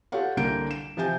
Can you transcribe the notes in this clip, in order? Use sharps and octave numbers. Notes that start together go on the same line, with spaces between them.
F4 G4 A4 C#5 F5 F#5
C2 D3 A#3 G6 D7
E7
C3 F3 E5 G#5 G6